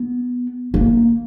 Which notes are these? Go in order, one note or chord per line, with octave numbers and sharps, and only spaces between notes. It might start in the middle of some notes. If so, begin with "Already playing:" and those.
Already playing: B3
A#3